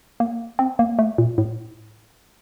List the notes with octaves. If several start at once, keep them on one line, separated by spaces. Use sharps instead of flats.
A#3
C4
A#3
A3
A#2
A2